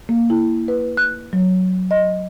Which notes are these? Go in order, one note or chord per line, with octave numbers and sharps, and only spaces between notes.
A#3
E4
B4
F#6
F#3
D#5